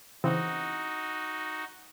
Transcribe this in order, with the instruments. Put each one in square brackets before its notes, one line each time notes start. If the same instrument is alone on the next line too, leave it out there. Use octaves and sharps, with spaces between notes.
[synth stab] C#3 E3 C4 [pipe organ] D#4 F#4